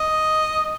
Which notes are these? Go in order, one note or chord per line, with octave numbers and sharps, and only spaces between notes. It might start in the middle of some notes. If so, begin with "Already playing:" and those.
Already playing: D#5